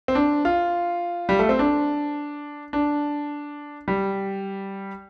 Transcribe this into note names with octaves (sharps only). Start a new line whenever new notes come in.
C4
D4
F4
G3
A3
C4
D4
D4
G3